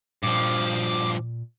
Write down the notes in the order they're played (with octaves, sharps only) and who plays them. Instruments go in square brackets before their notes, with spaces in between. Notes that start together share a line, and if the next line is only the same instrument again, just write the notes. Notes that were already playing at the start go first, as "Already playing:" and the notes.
[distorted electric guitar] G2 F3 [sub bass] A#2 [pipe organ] D6